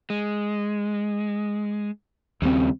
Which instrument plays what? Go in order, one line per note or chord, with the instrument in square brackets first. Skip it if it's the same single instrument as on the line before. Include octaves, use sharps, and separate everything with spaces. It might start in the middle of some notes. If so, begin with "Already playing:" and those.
[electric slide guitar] G#3
[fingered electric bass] D#2 C4 [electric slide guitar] C#3 G3